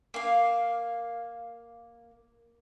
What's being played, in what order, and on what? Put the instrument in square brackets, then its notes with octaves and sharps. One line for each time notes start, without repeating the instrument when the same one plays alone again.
[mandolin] A#3 F5